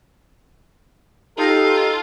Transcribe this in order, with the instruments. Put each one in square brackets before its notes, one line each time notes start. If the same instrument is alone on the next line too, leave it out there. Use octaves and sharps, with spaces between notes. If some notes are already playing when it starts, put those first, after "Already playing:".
[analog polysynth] D#4 [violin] F4 [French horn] G4 [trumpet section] A4